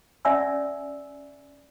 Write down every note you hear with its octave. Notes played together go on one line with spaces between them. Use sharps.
C#4 D5 E5 G#5 E6